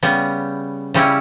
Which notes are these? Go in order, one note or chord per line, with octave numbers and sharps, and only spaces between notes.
C#3 G3 B3
C#3 G3 C#4 E4